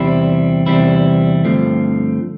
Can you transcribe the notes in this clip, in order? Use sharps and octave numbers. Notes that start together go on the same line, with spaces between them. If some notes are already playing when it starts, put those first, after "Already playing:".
Already playing: E2 C3 G3 C4 E4
E2 C3 G3 C4 E4
G2 D3 F3 A3 C4